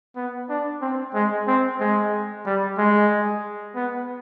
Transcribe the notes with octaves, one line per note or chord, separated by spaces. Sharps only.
B3
D4
C4
G#3
C4
G#3
G3
G#3
B3